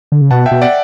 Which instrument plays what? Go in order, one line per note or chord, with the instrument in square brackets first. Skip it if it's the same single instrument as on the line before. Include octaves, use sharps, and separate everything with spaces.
[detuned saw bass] D3
C#3
[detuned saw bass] B2 [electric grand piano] F#5 A5
[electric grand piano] E5 G5
[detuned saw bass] B2
[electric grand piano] D5 F#5